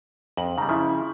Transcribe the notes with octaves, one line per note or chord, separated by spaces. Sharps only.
F2 F#7
C#3 G3 A#5
C#3 F3 E4